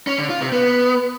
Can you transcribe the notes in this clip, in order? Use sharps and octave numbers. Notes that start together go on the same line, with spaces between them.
C#4
D3
F4
C3
B3